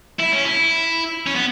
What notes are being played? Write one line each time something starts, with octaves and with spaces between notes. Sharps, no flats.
E4
C#4
E4
C#4
B3